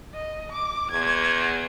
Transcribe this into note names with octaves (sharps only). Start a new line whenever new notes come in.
D#5
D6
E2 G#6